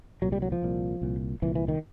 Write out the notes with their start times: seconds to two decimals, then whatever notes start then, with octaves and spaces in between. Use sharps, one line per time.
0.22 C2 A#2 F#3
0.32 G3
0.42 F#3
0.52 F3
0.62 C2 A#2
1.02 C2 A#2
1.42 C2 A#2 E3
1.55 E3
1.68 D#3